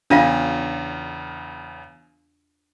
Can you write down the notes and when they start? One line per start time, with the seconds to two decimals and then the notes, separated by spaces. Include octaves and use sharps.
0.10 E2 C#3 D4 F4 F5 D#7